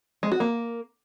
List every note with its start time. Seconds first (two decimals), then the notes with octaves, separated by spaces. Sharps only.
0.23 G#3
0.32 F#4
0.40 A#3